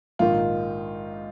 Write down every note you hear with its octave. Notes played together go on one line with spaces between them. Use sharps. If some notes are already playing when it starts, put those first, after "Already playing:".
A#1 G#2 D#3 F4